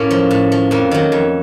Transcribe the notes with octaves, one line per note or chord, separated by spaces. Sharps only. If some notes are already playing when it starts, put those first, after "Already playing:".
Already playing: A2 A#3 C#4
F3
A2
F3
F2 A#3
D#3 F#3
F2